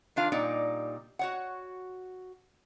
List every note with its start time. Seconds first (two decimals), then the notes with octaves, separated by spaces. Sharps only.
0.16 D#3 D4 F4 F5
0.32 A#2 G3 D#4 D5
1.19 F#4 C#5 F#5